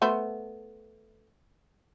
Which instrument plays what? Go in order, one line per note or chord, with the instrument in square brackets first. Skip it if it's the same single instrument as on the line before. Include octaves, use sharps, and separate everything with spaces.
[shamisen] A3 B3 C5